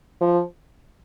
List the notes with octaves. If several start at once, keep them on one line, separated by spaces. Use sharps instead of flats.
F3